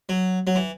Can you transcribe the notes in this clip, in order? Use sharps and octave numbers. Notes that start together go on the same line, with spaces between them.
F#3
F#3
E3